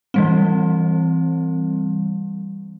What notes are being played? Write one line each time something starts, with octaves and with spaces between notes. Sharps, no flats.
E3 G3 C4